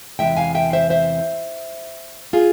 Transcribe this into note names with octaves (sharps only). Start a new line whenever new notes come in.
E2 C3 E3 G#3 E5 G5
F5 G#5
E5 G5
C5 E5
C5 E5
F4 G#4